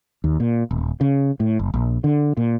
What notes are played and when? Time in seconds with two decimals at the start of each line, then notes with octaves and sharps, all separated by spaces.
0.24 D#2
0.40 A#2
0.71 D#1
1.01 C#3
1.40 A2
1.59 F#1
1.74 A#1
2.04 D3
2.37 A#2